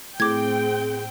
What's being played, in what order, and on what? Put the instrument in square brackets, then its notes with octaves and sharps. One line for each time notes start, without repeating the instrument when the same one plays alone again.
[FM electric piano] A2 [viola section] C4 G5 [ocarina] G#4 [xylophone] D6 G#6